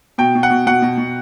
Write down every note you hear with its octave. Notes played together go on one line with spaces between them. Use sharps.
B2 G5
B2
F#5
B2
B2 F#5
B2
B2